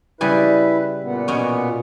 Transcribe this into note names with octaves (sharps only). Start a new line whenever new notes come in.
C#3 G3 E4 B4 G#5
A#2 B3
B2 C#4